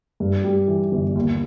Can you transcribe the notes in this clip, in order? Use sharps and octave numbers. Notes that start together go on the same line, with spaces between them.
G2
G3
E3
G1
D#2